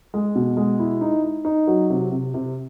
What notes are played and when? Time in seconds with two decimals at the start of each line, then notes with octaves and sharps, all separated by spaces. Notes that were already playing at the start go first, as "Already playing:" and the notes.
0.14 G#3
0.35 B2
0.57 G#3
0.79 E4
1.01 D#4
1.24 D#4
1.45 D#4
1.67 F#3
1.90 C3
2.11 C3
2.34 C3